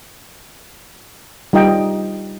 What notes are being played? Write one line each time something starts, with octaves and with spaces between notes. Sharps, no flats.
G3 D#4 F4 D#5 G5